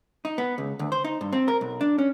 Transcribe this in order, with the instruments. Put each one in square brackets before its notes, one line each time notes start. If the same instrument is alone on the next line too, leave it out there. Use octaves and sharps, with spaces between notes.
[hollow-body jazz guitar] D#4
B3
C#2
D2
C5
D#4
G2
C4
A#4
B1
D4
C#4